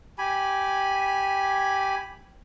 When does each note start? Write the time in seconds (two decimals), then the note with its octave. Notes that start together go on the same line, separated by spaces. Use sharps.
0.18 G4 G#5 B5